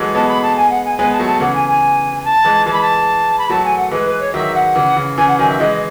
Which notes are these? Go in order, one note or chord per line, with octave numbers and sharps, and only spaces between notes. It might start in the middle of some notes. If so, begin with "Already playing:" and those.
Already playing: E3 F#3 G#3 A3
G#3 B3 A5
B5
A5
G#5
F#5
G#5
G#3 B3 G#5
A5
F#3 A3
A5
C#3 E3 F#5
G#5
G#5
A5
E3 G#3
E3 G#3 A5
B5
A5
B5
F#3 A3 A5
G#5
F#5
E3 G#3 B4
B4
C#5
D#3 F#3 E5
F#5
C#3 E3
C#3
C#3 E3 G#5
F#5
D#3 F#3 G#5
E5
E3 G#3 D#5